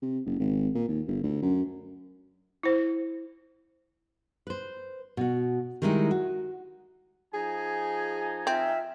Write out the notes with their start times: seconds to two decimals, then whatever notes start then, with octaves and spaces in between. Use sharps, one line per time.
0.02 C3
0.26 F#1
0.39 G#1
0.75 A#2
0.88 D#2
1.08 G1
1.24 D2
1.42 F#2
2.63 E4 C5
4.47 B4 C5
5.17 B2 F#4
5.82 D#3 G3 G#3 D#4 E4 G4
6.11 F#4
7.34 F3 D#4 G#4 G#5
8.47 C4 F4 E5